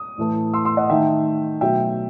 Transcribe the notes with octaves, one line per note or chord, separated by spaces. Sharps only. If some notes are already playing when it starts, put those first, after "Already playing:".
Already playing: D#6
A2 E3 A3
C6 E6
C6 E6
D#5 F#5
D#3 A3 D#4 E5 G5
B2 F#3 A3 E5 G5